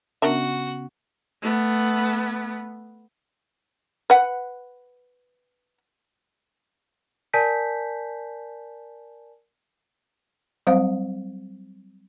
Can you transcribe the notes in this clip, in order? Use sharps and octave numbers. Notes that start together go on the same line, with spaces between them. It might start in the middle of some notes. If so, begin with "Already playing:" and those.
C#3 B3 C#4 D4 F#4 A#4 E5
A3 B3
B4 F#5
A#4 D5 G#5 A5 G6 B6
F#3 G3 C4 C5 F5